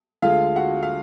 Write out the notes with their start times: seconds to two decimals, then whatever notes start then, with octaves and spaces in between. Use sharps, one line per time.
0.22 D2 D3 G#3 F4 F5
0.56 F#4 F#5
0.83 F5